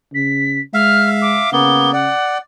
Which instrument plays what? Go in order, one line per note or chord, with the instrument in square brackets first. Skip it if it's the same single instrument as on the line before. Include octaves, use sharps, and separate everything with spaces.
[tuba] C#3 [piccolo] B6
[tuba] G#3 [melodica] E5 F5 [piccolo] F6
[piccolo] D6
[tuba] C#3 [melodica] A#3 B3 [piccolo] G7
[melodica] D5 [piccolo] F#5